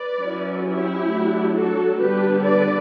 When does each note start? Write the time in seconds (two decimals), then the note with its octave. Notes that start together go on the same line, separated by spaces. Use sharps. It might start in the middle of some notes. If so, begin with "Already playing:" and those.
Already playing: B4 D5
0.20 F#3 C#4 E4
0.65 E4 G4
1.10 F#3 A3 D4
1.54 F#4 A4
1.99 D3 G3 B3 D4 G4 B4
2.44 B4 D5